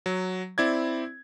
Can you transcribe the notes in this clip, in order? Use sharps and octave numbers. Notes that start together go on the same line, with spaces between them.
F#3
C4 E4 D5 G#6